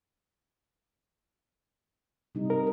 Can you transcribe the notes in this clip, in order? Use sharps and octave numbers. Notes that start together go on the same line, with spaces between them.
C3 G3 D#4
A#4